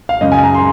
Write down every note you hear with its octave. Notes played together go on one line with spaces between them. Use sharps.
F5
F#2 C#3 G#3 D#5
G#5
A#5
C6